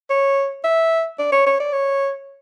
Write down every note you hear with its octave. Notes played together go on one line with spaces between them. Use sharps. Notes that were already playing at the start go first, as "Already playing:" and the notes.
C#5
E5
D5
C#5
C#5
D5
C#5